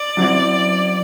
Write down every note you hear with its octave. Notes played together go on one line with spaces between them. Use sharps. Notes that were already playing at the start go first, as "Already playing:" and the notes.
Already playing: D5
F#2 F#3 C4 E4